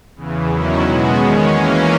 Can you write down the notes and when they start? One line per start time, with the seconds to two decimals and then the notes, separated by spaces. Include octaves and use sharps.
0.16 E2 C#3 E3
0.49 E2 D#3 F#3 C#4 E4
0.82 B2 G#3 B3 F#4
1.15 D#3 G#3 C#4
1.47 E3 A#3 C#4